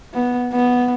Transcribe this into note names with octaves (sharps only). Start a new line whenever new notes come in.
B3
B3